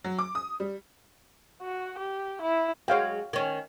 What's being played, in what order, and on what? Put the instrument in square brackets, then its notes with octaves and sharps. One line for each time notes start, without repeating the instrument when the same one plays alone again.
[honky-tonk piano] F#3
D6
D#6
G3
[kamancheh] F#4
G4
E4
[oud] F#3 G#3 [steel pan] C#5 F5 G5
[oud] D#3 C#4